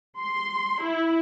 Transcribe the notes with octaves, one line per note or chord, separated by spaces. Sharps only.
C6
E4